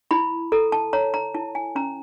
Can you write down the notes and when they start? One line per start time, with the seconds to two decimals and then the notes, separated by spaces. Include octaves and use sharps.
0.11 E4 B5
0.52 A4 A#5
0.72 A5
0.93 C#5 A#5
1.14 A#5
1.34 E4 A5
1.55 G#5
1.75 C#4 A#5